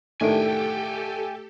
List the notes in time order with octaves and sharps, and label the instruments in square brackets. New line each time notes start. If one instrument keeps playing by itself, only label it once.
[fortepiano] A2 D#3 D4 [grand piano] A3 [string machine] G4 A4 [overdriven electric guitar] G5 G#5